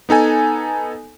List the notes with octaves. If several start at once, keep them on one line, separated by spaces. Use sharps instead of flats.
B3 D#4 A4 G#5